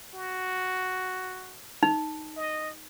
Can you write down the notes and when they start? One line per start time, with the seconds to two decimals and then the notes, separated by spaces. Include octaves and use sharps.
0.14 F#4
1.83 D#4
2.37 D#5